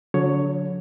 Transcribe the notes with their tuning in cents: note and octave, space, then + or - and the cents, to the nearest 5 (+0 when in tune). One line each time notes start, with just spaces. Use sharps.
D3 -35 F#3 -35 C#5 +5